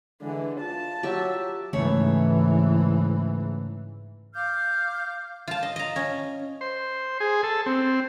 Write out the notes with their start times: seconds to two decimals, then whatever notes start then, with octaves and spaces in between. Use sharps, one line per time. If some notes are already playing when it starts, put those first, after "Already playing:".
0.22 D3 E3 G#3
0.60 F4 A5
1.03 F#3 G4 E5
1.73 G#2 C#3 E3 A3 C#5
4.34 F5 D6 F6 G6
5.47 F4 A5
5.63 D#5
5.76 D#5 A#5
5.96 C#4
6.61 C5
7.20 G#4
7.43 A4
7.66 C4